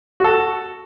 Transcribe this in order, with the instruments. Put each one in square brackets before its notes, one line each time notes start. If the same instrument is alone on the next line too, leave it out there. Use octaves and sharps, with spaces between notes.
[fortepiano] F#4 A4